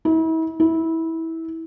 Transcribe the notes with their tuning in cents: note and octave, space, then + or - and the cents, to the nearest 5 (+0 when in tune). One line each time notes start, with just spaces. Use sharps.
E4 -40
E4 -20